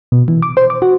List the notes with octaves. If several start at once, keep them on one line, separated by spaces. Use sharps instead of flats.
B2
E3
D6
C5
D6
F#4